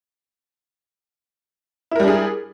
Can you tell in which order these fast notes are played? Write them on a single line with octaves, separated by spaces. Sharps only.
E4 A#4 G3 D4 G#4